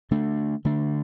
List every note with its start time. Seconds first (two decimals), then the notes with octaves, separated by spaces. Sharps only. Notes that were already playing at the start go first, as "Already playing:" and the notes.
0.11 D3 A3 D4
0.65 D3 A3 D4